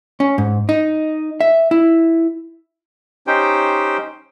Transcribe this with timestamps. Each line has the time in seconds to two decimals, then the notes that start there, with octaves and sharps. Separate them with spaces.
0.20 C#4
0.38 G#2
0.69 D#4
1.41 E5
1.71 E4
3.27 C#4 D#4 G4 C5 G5